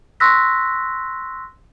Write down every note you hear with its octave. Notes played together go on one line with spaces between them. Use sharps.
C6 C#6 E6 F#6 A#6 B6